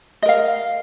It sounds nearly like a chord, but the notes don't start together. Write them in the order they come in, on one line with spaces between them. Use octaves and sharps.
D#5 A#4 F5